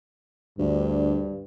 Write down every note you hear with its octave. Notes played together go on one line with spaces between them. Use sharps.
D2 G2